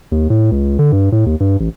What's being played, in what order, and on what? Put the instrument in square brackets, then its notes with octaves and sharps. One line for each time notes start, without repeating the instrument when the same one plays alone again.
[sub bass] D#2
A2
C#2
D3
G2
A2
D#2
G2
A1